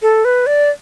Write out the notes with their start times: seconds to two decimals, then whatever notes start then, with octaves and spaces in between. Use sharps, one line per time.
0.02 A4
0.25 B4
0.47 D5